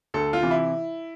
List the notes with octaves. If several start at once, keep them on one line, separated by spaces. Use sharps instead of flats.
D2 A4
F4
C3 E3
E4